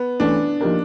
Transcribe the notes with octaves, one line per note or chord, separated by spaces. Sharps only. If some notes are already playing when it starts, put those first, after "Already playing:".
Already playing: B3
E3 A3 C#4 D4
F3 A#3 D#4 G4 A#4